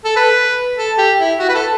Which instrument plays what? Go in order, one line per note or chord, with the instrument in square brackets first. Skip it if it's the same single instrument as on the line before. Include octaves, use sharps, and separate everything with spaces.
[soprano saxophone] A4
B4
A4
G4
E4
F#4
B4
A4